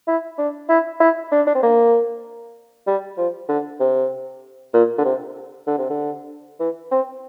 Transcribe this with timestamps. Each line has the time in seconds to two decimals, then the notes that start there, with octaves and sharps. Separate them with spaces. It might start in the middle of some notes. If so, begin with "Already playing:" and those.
0.07 E4
0.38 D4
0.69 E4
1.00 E4
1.32 D4
1.47 D4
1.55 C4
1.63 A#3
2.87 G3
3.18 F3
3.49 D3
3.80 C3
4.73 A#2
4.98 D3
5.05 C3
5.67 D3
5.78 C3
5.90 D3
6.60 E3
6.91 C4